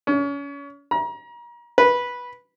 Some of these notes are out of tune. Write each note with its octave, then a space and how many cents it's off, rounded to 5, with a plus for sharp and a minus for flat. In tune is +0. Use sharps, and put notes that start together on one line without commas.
C#4 +30
A#5 +35
B4 -10